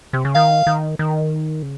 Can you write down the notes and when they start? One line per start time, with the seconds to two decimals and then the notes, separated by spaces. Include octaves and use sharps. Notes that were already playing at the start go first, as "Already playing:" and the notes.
0.13 C3
0.25 C#3
0.35 D#3 F5
0.67 D#3
0.99 D#3
1.63 C#3